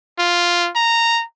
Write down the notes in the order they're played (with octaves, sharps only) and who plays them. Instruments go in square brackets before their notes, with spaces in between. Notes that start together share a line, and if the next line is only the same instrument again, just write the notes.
[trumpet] F4
A#5